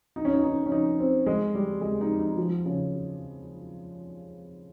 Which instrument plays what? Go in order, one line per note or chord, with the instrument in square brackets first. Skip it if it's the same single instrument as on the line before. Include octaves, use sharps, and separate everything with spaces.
[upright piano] D#4
C#4
D#4
D#4
C#4
D#4
C4
G#3
G3
G#3
D#4
D#4
F3
C#3